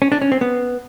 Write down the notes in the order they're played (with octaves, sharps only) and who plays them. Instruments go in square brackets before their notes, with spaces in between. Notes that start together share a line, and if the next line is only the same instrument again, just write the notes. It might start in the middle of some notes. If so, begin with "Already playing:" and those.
[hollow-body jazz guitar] C#4
D4
C#4
C4
B3